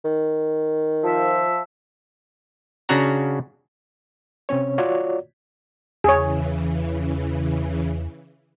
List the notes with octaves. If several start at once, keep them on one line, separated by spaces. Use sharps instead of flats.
D#3
F3 E5
C#3 C#4 D4 F#4 F#5 A#5
C3 C4 C#4 C#5
F4 F#4 C#5 D5
E2 C#3 E3 G#4 C#5